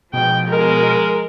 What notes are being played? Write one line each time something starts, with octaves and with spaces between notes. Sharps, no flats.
G#2 B2 F3 G5
G#3 A#4